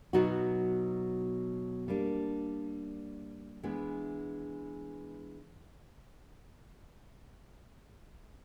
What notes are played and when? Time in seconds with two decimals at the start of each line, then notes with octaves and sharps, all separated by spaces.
0.13 B2 F#3 B3 D#4 F#4
1.88 G3 A#3 D4
3.63 E3 G#3 B3 D4